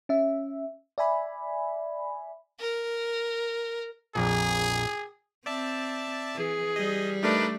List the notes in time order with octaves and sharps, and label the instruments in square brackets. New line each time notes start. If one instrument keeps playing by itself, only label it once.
[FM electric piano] C#4 E5
D5 E5 G#5 B5
[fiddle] A#4
[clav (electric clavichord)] A#1 F2 A#2 [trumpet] G#4
[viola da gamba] C4 [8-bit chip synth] D5 E5 A5
[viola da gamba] E3 [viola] G#4
[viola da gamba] G3 [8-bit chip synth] D#5
[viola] A3 D4 [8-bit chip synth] D#4 A#4 B4